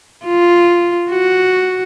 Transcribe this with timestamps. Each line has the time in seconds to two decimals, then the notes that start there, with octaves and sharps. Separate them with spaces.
0.25 F4
1.10 F#4